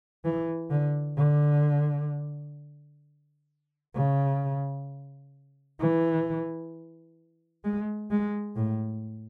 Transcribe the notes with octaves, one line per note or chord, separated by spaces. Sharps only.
E3
D3
D3
C#3
E3
G#3
G#3
A2